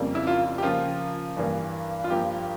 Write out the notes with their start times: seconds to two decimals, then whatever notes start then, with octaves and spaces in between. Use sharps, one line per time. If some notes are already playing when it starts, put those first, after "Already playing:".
Already playing: F2 C#3 G3 A#3
0.15 E4
0.27 F4
0.58 G4
0.63 C#3 F3 A#3 F4
1.37 G2 E3 G3 A#3
2.04 F4
2.10 G2 F3 A#3 G4